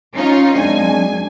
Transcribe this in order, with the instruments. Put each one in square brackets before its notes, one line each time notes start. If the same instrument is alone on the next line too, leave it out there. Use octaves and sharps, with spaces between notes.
[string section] C#4 D#4 F4
[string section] F#2 G#5 [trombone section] G#3 C4 D4